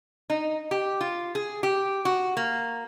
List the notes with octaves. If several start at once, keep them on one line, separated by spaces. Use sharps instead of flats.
D#4
G4
F4
G#4
G4
F#4
A#3